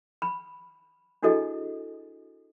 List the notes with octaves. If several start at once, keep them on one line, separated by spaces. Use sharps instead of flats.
B5
D4 E4 F#4 G#4 A4 D#5